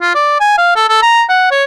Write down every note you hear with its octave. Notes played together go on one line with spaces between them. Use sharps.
F4
D5
G#5
F5
A4
A4
A#5
F#5
C#5